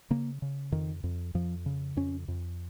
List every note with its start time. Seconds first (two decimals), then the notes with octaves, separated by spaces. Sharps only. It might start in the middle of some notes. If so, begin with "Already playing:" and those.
0.10 C#3 A#3
0.42 C#3
0.72 F2 D#3
1.04 F2
1.34 F2 F3
1.66 C#3
1.96 F2 C#4
2.28 F2